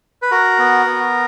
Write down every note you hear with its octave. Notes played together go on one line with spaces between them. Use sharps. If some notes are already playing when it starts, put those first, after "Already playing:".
B4
F#4 A#4
B3
B3